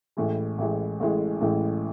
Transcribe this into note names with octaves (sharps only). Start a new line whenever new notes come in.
A1 A2 E3 G#3
A1 A2 E3 G#3
A1 A2 E3 G#3
A1 A2 E3 G#3